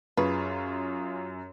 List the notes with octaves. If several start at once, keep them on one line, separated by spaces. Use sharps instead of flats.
F#2 F4 G#4 B4 C#6